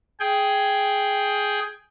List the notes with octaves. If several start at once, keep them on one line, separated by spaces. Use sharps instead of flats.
G#4 G5